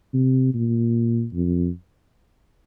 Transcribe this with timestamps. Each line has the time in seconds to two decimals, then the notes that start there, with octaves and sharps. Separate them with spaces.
0.14 C3
0.54 A#2
1.33 F2